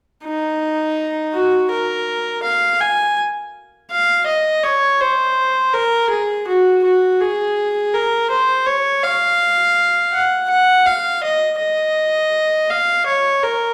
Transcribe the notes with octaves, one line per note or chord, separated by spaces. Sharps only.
D#4
F#4
A#4
F5
G#5
F5
D#5
C#5
C5
A#4
G#4
F#4
F#4
G#4
A#4
C5
C#5
F5
F#5
F#5
F5
D#5
D#5
F5
C#5
A#4